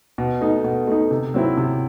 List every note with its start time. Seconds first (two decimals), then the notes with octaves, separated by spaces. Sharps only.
0.18 B2
0.41 A3 D#4
0.64 B2
0.87 A3 D#4
1.11 C3
1.34 F#3 C4 E4
1.57 C3